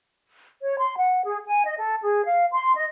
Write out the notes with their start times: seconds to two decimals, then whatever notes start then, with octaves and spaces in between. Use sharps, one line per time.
0.61 C#5
0.78 C6
0.97 F#5
1.25 G#4
1.47 G#5
1.65 D#5
1.78 A4
2.03 G#4
2.25 F5
2.52 C6
2.76 D#5